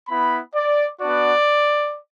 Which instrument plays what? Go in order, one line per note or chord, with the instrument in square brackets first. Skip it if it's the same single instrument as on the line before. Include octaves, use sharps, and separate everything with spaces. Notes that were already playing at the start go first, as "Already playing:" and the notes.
[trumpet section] B3 E4 B5
D5
B3 D4 F#4 D5